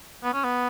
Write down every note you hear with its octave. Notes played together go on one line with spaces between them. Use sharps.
B3
C#4
B3